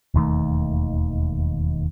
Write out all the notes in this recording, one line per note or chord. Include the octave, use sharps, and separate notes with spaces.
E1 D#2 D#3 A3